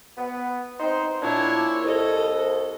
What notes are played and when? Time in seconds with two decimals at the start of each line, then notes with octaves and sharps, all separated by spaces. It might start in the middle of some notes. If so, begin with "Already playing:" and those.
0.17 B3
0.80 C4 D#4 C5
1.22 A#2 D4 E4 C#5
1.84 C2 A4 D#5